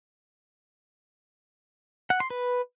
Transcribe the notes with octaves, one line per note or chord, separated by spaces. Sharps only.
F#5
C6
B4